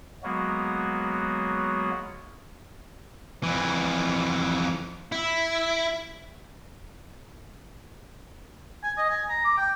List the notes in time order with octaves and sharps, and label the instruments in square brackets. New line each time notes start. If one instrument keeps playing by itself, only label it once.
[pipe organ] F#3 G#3 A#3 B3 F#4
[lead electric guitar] F2 E3
E4
[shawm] G#5
D#5
G#5
A#5
D6
G5